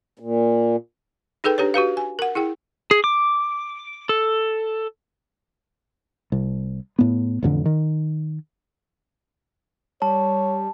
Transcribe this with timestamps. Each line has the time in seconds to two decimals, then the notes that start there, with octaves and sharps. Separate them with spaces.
0.19 A#2
1.44 D#4 G#4 A4 B4 G5
1.58 D4 G4 B4 C#5
1.74 F#4 G4 B4 F5
1.97 G#5
2.19 A#4 F#5
2.35 E4 G#4 G5
2.91 G#4
3.04 D6
4.09 A4
6.32 C2
6.99 A2 B3
7.43 A1 F2 D3
7.66 D#3
10.02 G3 C#5 A5